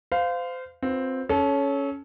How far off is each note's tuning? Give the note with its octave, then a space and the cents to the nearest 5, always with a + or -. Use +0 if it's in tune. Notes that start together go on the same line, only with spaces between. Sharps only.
C5 -30 F5 +0
C4 +0 F4 +30 B4 +0
C#4 +5 A4 -25 C#5 +0